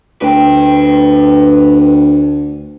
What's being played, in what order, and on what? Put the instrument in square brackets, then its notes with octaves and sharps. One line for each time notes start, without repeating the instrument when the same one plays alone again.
[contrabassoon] D2 [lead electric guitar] B4 G5